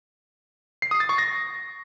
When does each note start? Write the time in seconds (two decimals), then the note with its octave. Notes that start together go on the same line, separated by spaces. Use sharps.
0.82 C7
0.91 D#6
1.00 A6
1.09 C#6
1.18 A#6